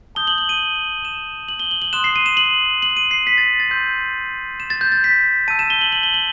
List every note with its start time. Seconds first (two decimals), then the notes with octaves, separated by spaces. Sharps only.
0.15 A5 D#6 G6 G7
0.27 F#7
0.38 F#7
0.49 D#7
1.05 E7
1.48 F#7
1.60 G7
1.71 F#7
1.82 F#7
1.93 C6 D#6 F#6 E7
2.04 C7
2.16 D#7
2.26 E7
2.37 F#7
2.82 F#7
2.97 D#7
3.11 C7
3.27 B6
3.38 A6
3.60 A6
3.70 C6 E6 G6
4.60 E7
4.70 A6
4.81 G6
4.92 A6
5.04 B6
5.48 A5 E6 G6 D#7
5.59 E7
5.70 G7
5.81 F#7
5.92 F#7
6.03 G7
6.14 F#7